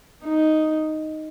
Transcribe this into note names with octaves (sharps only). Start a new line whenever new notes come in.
D#4